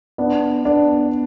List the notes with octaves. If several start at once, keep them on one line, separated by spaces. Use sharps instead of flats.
B3 D4
B3 D4